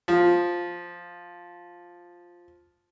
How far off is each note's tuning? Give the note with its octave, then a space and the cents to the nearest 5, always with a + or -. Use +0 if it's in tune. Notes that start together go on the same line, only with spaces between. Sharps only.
F3 +5